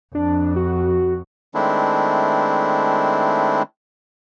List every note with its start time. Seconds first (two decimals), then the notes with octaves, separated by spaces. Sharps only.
0.15 F2 D4
0.56 F#4
1.55 D#3 G#3 A3 C4 D4 E4